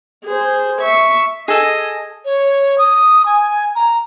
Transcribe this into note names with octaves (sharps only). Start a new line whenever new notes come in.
G#4 C5
E5 C#6
G#4 A4 D#5 G#5
C#5
D#6
G#5
A#5